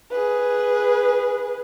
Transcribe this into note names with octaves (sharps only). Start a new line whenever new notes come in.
G#4 B4